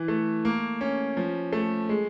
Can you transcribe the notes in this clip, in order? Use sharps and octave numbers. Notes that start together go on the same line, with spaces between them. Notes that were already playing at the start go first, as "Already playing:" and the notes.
Already playing: E3
A3
A#3
C#4
F3
A3
G#3